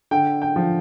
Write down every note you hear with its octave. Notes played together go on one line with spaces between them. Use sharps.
D3 G5
G5
F3